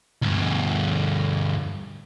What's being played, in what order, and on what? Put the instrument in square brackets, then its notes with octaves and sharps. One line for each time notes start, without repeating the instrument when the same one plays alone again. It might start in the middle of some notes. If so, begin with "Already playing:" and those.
[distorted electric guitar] D2 G2